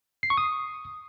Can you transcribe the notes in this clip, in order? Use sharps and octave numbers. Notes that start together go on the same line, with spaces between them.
C7
C#6
D#6